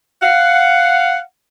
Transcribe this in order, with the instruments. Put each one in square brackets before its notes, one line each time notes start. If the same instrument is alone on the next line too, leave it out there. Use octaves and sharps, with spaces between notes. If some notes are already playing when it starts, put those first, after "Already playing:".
[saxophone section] F5 F#5